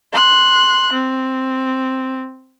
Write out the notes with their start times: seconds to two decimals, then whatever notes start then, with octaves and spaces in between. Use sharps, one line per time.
0.12 C6 F#6
0.92 C4